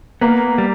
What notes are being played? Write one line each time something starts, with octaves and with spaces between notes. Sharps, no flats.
A#3 B3
G3